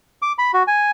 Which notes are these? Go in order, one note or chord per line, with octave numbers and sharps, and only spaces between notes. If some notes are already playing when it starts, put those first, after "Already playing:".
D6
B5
F#4
G#5